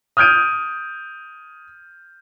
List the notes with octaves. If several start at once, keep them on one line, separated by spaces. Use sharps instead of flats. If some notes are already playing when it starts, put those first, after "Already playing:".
D#6 F6 G6 G#6 D7 D#7